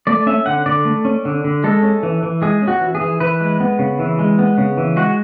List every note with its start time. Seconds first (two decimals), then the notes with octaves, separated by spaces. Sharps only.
0.07 A3 D5
0.27 C#4 E5
0.46 D3 F#5
0.66 D3 D5
0.85 A3
1.05 C#4
1.25 D3
1.44 D3
1.64 G#3 A4
1.83 C#4
2.03 E3
2.23 E3
2.42 G#3 G#4
2.62 C#4
2.68 F#4
2.81 E3
2.95 G#4
3.01 E3
3.20 E3 B4
3.41 G#3
3.60 B3
3.79 C#3
3.99 E3
4.19 G#3
4.39 B3
4.58 C#3
4.78 E3
4.96 G#3 F#4